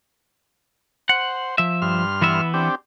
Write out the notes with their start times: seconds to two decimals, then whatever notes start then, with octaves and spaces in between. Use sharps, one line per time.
1.09 C5 F#5
1.58 F3 E5
1.82 G2 C6 F6
2.22 E3 B3 E5
2.54 C4 D4 G4